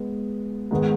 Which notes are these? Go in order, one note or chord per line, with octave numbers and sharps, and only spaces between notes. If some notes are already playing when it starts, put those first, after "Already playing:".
Already playing: G#3 B3
G#2 D#3 G#3 B3